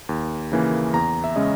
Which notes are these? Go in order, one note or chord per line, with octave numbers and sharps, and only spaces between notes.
D#2
C#3 E3 A#3 C#4
E2 A#5
E5
C#3 G#3 C#4 D#5